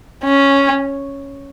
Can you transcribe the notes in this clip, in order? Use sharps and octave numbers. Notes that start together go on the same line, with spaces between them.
C#4